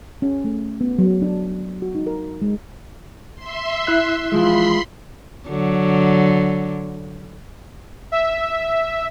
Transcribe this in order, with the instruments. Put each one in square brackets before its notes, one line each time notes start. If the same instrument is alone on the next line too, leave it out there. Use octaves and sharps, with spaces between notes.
[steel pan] C#4
A3
B3
F#3
D4
F#4
D#4
A#4
G#3
[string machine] E5 C6
[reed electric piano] E4 F#6
[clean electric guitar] E3 F3 G#3 [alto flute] F4 [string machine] B5 C6 C7
[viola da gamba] D3 F#3
[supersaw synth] E5